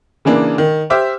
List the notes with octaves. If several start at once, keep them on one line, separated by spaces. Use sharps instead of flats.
C#3 E3 A#3 D4
D#3
G4 C5 E5 D6 F6